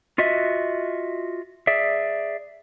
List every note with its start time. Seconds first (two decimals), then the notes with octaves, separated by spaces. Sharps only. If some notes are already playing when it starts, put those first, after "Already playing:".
0.18 F4 F#4 D#5 E5
1.67 G#4 D5 E5